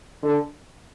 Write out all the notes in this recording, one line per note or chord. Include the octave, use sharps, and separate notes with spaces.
D3